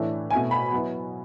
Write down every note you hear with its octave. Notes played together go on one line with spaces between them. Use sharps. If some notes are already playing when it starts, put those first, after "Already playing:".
Already playing: A2 E3 A3 D4
B2 A3 E4 G#5
B5
F#3 B3 E4